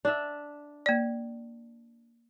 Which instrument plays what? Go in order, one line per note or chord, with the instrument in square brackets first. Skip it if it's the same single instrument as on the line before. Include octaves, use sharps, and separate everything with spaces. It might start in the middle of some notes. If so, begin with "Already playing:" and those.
[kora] D4 E5
[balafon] A#3 D5